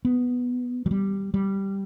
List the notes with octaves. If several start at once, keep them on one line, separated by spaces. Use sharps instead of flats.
B3
F#3
G3
G3